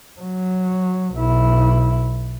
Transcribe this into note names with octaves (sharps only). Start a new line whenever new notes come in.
F#3
B1 E4